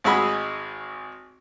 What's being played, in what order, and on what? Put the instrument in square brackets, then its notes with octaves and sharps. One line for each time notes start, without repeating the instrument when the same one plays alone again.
[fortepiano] G#1 G#3 F#4 G#4 B5 E6